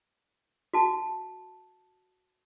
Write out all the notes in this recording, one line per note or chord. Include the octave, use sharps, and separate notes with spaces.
F#4 A5